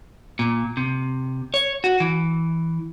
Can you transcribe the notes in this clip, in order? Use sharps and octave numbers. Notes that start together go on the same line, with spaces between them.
A#2
C3
C#5
F#4
E3